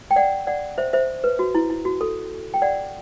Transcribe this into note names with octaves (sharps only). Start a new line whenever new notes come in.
G5
D5 F#5
D5 F#5
C5 E5
C5 E5
B4
F#4
E4
E4
F#4
A4
G5
D5 F#5